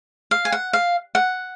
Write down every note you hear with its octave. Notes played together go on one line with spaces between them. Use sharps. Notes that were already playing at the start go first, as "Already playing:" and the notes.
F5
G#5
F#5
F5
F#5